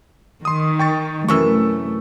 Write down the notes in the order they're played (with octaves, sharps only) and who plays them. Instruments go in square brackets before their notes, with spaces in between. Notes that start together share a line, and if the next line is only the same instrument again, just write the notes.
[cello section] D#3 [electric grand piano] C6 D#6
[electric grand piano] G5 C#6 A6
[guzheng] F#2 C3 E3 [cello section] A3 [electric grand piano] C#6 E6